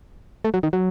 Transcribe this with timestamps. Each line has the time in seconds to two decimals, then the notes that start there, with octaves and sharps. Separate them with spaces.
0.44 A3
0.54 F#3
0.63 D#3
0.73 F#3